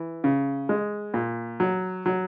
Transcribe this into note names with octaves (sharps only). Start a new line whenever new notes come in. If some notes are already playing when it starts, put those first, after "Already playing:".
Already playing: E3
C#3
G#3
A#2
F#3
F#3